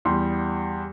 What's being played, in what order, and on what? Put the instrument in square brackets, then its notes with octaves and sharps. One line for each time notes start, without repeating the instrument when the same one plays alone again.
[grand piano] E2 G3 C6